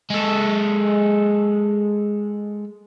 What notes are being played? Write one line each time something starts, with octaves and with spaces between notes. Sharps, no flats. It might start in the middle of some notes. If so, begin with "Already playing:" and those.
G#3 A4